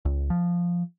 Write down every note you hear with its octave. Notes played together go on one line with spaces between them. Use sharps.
C#2
F3